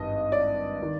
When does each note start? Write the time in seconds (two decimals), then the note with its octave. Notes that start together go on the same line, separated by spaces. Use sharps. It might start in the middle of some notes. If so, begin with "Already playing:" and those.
Already playing: G#1 G2 D#5
0.32 D5
0.82 D#3